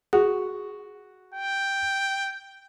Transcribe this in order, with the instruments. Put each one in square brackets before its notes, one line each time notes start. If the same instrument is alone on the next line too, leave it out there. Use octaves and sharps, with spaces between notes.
[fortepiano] F#4 [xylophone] G#4
[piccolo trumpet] G5